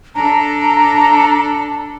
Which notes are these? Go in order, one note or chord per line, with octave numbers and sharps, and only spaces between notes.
D4 A4 A#5